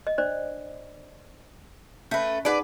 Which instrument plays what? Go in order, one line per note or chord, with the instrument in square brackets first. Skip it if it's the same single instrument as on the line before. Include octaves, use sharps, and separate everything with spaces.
[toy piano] D#5
D4 C5 D5
[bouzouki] A3 B4 [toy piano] C#4 E5
[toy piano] D#4 G#4 F#5 [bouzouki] B4 D5